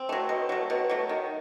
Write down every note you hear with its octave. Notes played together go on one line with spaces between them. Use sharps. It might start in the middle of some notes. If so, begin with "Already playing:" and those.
Already playing: C4
F#3 A3
B2
F#3 A3
B2
F#3 A3
D#3